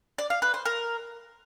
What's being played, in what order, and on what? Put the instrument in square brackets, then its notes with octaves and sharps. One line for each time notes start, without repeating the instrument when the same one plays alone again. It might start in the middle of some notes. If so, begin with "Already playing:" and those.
[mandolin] D5
F5
B4
C5
A#4